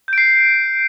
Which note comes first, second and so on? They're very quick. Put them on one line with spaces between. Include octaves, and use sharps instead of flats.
G6 D7 C7